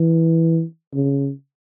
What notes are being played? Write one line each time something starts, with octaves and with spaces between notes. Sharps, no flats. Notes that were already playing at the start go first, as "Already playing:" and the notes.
Already playing: E3
C#3